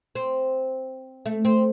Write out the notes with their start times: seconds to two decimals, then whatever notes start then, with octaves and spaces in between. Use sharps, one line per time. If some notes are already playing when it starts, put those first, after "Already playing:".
0.15 C4
1.26 A3
1.45 C4